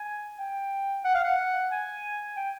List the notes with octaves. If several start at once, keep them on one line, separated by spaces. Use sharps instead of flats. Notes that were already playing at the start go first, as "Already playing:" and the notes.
Already playing: G#5
G5
F#5
F5
F#5
G#5
G5